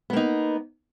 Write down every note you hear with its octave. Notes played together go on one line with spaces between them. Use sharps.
A#3 B3 D#4